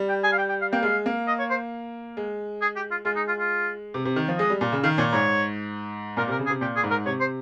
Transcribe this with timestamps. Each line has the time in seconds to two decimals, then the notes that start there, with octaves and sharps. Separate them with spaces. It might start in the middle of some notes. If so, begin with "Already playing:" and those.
Already playing: G3
0.09 G5
0.23 G#5
0.32 F5
0.38 G5
0.49 G5
0.61 F5
0.72 A#3 G5
0.83 G#3 F5
1.06 A#3
1.27 D#5
1.39 C#5
1.50 C5
2.17 G#3
2.61 G#4
2.76 G4
2.91 F4
3.05 G#3 F4
3.16 D#4
3.28 F4
3.39 F4
3.94 C3
4.05 C3
4.16 D#3
4.28 F3
4.38 G#3 D#5
4.50 G3
4.61 A#2
4.72 C#3
4.84 D#3 F5
4.98 A#2 C#5
5.13 G#2 C#5
6.17 A#2 A#4
6.28 C3 A#4
6.39 C#3
6.46 G#4
6.50 C3
6.61 A#2 G4
6.76 G#4
6.84 G#2
6.90 A#4
7.06 C3 C#5
7.20 C5